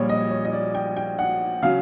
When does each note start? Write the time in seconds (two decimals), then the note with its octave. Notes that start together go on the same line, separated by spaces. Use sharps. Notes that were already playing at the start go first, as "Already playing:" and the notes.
Already playing: A#1 A#2 G3 C#5
0.09 D#5
0.31 C#5
0.45 D#5
0.53 D5
0.75 G5
0.96 G5
1.19 F#5
1.63 C#3 F#3 F5